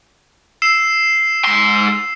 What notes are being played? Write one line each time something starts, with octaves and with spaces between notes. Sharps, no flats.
E6 C7 E7
G#2 C6